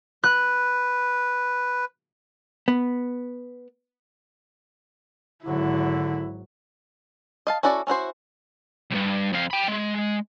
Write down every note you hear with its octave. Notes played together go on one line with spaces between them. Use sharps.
B4 F#6
B3
G#1 D3 F#3 E4
D#5 F5 A5
C#4 E4 F#4 A4 D5
C#4 E4 F#4 C5
B1 G2
F2 F5
G5 B5
G#3